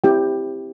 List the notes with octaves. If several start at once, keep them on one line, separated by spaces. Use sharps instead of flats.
C4 E4 G4 G5